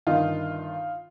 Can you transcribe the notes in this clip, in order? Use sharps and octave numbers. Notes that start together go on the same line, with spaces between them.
G1 G2 D#3 D#4 F4